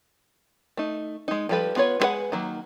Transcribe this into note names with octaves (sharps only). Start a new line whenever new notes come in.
A3 D#4
G#3 D#4
F3 G3 G4 A4 B4
B3 F4 B4 C#5
G#3 C4 G#4 B4 F#5
D#3 F#3 A#3